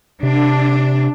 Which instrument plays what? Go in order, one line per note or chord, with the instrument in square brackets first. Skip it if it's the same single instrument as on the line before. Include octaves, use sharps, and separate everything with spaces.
[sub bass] C3 [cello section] D4